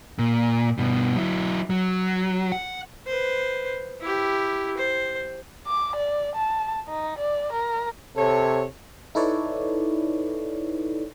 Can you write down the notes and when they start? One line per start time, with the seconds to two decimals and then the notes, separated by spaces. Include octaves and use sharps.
0.19 A#2
0.78 G2 B2
1.16 F#3 E4
1.70 F#3
2.52 F#5
3.07 B4 C5
4.01 E4 G4
4.78 C5
5.67 D6
5.96 D5
6.35 A5
6.88 D#4
7.18 D5
7.52 A#4
8.17 C3 A4 C#5
9.15 D#4 E4 A4 B4 C#5 D5